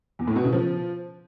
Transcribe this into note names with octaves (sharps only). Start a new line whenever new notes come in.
E2
A2
B2
C#3
F3